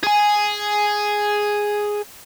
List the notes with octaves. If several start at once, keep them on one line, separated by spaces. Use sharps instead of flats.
G#4 G#5